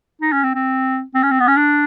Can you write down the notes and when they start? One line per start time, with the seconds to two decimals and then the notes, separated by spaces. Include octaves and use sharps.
0.21 D#4
0.33 C#4
0.44 C4
0.55 C4
1.15 C4
1.23 C#4
1.31 C4
1.40 B3
1.48 C#4
1.57 D4